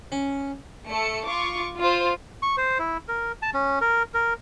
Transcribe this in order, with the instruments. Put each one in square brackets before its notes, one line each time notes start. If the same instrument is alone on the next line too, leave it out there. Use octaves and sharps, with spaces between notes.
[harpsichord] C#4
[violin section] A3 A4 C#7
F4 C#6 D6
F4 C5
[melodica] C#6
C5
E4
A#4
A5
C#4
A#4
A#4